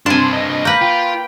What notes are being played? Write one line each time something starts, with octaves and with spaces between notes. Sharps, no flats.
G2 C3 D4 C5 G#5 A5 C6
D#5
A#3 B4 G6 A#6
F4 G5